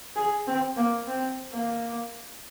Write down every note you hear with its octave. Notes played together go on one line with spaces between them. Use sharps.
G#4
C4
A#3
C4
A#3